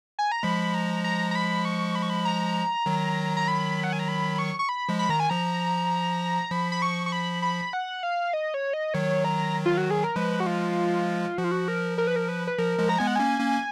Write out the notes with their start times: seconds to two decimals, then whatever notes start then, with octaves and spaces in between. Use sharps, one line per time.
0.19 G#5
0.32 A#5
0.43 F3 G#3 B5
0.74 A#5
1.04 A#5
1.31 A#5
1.35 B5
1.65 C#6
1.95 B5
2.02 C#6
2.10 B5
2.25 A#5
2.86 D#3 F#3
3.37 A#5
3.48 B5
3.84 F#5
3.93 G#5
4.00 A#5
4.08 B5
4.39 C#6
4.59 C#6
4.69 B5
4.89 F3 G#3
4.99 B5
5.09 D#3 A#5
5.20 G#5
5.30 F3 A#5
6.51 F3 B5
6.72 B5
6.82 C#6
7.06 C#6
7.12 B5
7.42 B5
7.73 F#5
8.03 F5
8.33 D#5
8.54 C#5
8.73 D#5
8.94 D#3 F#3 C#5
9.24 A#5
9.66 F4
9.77 F#4
9.90 G#4
10.04 A#4
10.16 F3 G#3 B4
10.40 F#4
10.46 F4
11.38 F3 F#4
11.44 F4
11.51 F#4
11.68 A#4
11.98 A#4
12.07 B4
12.16 A#4
12.29 B4
12.47 B4
12.58 F3 A#4
12.79 F3 G#3
12.89 A#5
12.99 G#3 B3 G#5
13.07 F#5
13.16 A#3 C#4 G#5
13.39 A#3 C#4